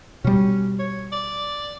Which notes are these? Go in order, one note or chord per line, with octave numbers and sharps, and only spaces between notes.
B2 G3 C#4
C#5
D5